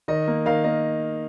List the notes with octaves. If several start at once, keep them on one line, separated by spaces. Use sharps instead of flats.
D#3 D#5
A#3
D#3 F5
A#3 D#5